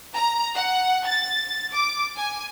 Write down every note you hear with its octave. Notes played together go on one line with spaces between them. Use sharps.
A#5
F#5
A6
D6
G#5